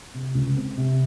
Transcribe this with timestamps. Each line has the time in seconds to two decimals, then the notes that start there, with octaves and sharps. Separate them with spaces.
0.14 C3
0.35 C#2
0.57 C4
0.77 C3